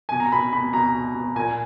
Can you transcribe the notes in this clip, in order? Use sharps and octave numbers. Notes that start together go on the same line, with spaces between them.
B2 G#5
A#5
B2 B5
B2 B5
B2 A#5
B2
B2
A#2 G#5